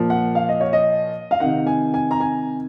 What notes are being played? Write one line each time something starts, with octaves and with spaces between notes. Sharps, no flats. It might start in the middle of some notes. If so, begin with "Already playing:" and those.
Already playing: A#2 F3
F#5
F5
D#5
C#5
D#5
F5
C3 D#3 F#5
G#5
G#5
A#5
G#5